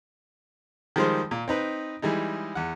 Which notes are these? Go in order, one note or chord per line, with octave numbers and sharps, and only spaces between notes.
D#3 F3 G3 G#3 D#4 C5
A#2
C4 D#4 B4
E3 G3 G#3 D#4
E2 F#5